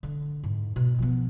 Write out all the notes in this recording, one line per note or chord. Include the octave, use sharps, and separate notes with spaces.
D3
G#2
B2
F3 B3